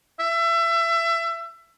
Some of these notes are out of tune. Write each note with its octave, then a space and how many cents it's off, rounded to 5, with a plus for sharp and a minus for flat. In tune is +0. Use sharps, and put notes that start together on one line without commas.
E5 +25